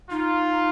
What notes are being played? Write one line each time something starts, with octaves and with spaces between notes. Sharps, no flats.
D#4 F4